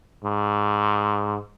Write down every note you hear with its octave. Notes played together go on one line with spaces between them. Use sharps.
G#2